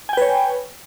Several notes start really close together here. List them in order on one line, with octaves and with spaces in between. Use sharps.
G#5 G5 B4 C#5